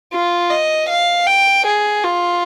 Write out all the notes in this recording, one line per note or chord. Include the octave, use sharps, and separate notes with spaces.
F4
D#5
F5
G5
G#4
F4